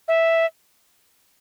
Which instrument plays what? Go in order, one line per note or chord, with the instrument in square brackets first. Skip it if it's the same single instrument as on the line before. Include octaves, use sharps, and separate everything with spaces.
[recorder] E5